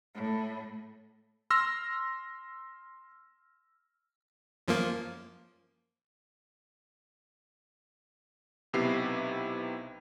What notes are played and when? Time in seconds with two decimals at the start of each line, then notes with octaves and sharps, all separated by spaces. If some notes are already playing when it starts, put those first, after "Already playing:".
0.15 A2
1.50 C6 E6 F6 A#6
4.68 F#2 F3 A#3
8.73 B1 C3 B3 E4 G4 C7